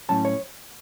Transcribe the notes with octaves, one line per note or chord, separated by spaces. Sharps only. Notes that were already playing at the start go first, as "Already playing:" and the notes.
A2 F#3 C#4 A5
C#5